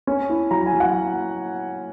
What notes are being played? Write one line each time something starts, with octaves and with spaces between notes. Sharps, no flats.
C#4
E4
F#3 A#5
G#5
F#3
F#5